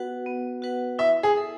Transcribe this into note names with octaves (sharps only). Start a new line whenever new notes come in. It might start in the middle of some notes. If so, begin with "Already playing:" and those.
Already playing: B3 F#4 B4 F#5
B3
F#4 B4 F#5
E4 E5
G#4
A4 E5